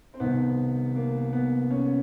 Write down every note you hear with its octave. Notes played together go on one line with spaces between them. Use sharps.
C4
C2 C3 D#3 B3
A#3
B3
C#4